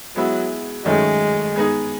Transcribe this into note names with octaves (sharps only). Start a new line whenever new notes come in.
F#3 G#3 B3 E4
D#3 F#3 G#3 A3 C#4
G#3 B3 D#4 G#4